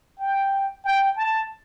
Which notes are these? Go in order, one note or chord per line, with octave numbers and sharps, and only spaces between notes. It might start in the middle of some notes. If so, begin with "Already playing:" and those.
G5
G5
A5